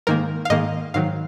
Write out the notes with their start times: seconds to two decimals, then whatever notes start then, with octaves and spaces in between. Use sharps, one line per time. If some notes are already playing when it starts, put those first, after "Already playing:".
0.07 G#2 D#3 A#3 A#4
0.45 F5
0.50 G#2 D#3 A#3 D#5
0.94 G#2 D#3 F#3 F5